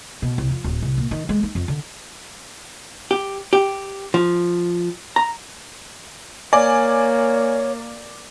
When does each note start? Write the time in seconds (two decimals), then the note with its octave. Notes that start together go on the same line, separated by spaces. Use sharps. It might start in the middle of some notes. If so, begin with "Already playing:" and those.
0.22 B2
0.38 C2
0.51 F2
0.64 D1
0.82 C2
0.98 A#2
1.11 D#3
1.29 G#3
1.43 D#4
1.55 F2
1.68 D3
3.11 G4
3.53 G4
4.14 F3
5.16 A#5
6.53 A#3 C#5 D5 G#5